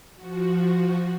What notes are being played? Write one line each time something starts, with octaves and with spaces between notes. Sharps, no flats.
F3 F#4